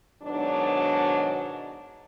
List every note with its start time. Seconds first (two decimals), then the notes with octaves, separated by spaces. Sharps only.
0.23 G#2 B2 D#3 F#3 D4